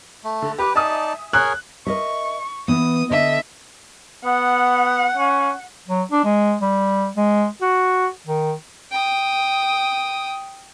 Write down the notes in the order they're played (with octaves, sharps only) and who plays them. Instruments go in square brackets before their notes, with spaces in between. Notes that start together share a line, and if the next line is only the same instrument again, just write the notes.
[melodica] A3
[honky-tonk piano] D3
[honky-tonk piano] G4 D6 [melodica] B4
[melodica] D#4 D5 A5 [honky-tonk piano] E5 G#5 D#6
[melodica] G#4 A#4 C#5 [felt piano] F#6
[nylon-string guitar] A#4 D#5 E5 [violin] C#6
[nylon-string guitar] E3 B3 [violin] D#6
[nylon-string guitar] D3 [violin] D#5 E5
[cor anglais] B3 [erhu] F#5
[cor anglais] C#4
[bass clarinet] F#3
D4
G#3
G3
G#3
F#4
D#3
[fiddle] G5 D#6